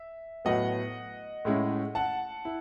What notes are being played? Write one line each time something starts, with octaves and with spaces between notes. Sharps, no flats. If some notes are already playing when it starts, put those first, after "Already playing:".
Already playing: E5
A2 F#3 B3 D#5 F#5
A2 G#3 C#4 E4
F#5 A5
E4